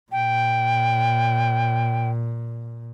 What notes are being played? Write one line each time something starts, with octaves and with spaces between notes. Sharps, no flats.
A#2 G5